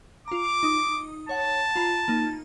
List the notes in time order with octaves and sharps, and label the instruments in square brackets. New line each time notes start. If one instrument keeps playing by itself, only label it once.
[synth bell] F4 A#5 [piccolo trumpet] D6
[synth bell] D#4 D#6
[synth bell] C#5 F#5 [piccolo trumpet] A5
[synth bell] F4 A#5 B5
A#3 D#4